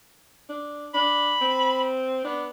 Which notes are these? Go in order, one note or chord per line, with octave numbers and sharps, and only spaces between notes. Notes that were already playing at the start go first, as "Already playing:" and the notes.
D4
D4 B5
C4
B3 D4